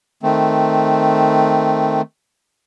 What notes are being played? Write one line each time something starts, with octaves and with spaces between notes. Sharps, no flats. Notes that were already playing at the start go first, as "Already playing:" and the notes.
D#3 A3 C4